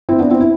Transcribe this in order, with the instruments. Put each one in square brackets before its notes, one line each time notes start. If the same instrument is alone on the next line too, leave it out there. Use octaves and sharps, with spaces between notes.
[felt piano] C4 E4
B3 D4
C4 E4
E4